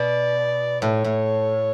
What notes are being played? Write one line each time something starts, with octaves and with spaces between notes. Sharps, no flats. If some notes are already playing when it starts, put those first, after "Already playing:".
Already playing: B2 D5
A2 C#5
A2